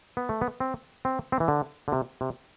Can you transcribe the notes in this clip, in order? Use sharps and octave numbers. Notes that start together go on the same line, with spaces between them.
B3
A3
B3
C4
C4
C4
E3
D3
D3
C3
C3